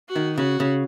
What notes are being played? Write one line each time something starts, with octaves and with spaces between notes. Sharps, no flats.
F#4
D#3
C#3 F#4
C#3